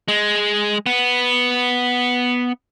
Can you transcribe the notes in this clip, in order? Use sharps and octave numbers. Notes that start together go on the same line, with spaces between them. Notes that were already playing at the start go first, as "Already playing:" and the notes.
G#3
B3